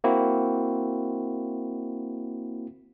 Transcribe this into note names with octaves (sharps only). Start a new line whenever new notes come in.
A#3 C4 E4 F#4